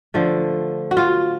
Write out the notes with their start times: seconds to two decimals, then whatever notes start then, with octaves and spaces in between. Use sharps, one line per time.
0.14 D3 F3 A3
0.91 F#4
0.97 F4